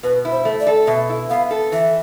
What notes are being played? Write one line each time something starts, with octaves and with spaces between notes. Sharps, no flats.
B2 B4
E4
C5
A3
D5
A4
B2 E5
E4
B3 F5
A4
E3 E5